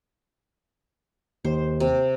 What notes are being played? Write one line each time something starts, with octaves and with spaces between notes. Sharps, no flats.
D#2 C5
C3